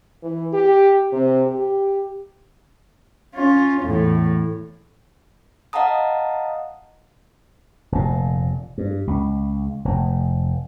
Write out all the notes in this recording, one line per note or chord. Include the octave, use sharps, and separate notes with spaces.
E3
G4
C3
G4
C#4 F4
E2 A2
D#5 F5 F#5 A5 A#5 D#6
F1 A#2
G2
C#2
F1